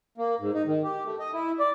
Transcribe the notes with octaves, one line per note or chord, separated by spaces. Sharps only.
A#3
G#2
D#4
D#3
G4
A3
D#5
E4
D5